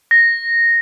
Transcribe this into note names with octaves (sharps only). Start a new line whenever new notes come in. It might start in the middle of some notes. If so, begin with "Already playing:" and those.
A#6